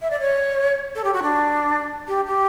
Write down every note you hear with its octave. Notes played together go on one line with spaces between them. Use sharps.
E5
D5
C#5
A4
G4
F#4
D4
G4
G4